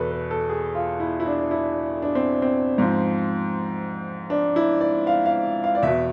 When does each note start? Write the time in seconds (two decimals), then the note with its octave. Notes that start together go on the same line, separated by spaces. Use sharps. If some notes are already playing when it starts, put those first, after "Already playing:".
Already playing: E2 B2 A4 B4
0.11 B4
0.31 A4
0.49 G#4
0.75 F4
1.00 E4
1.20 E4
1.26 D4
1.51 E4
2.02 D4
2.15 C4
2.42 C4
2.78 G#2 F3
4.30 D4
4.56 E4
4.81 D5
5.07 F5
5.26 F5
5.64 F5
5.75 D5
5.83 E2 B2 E5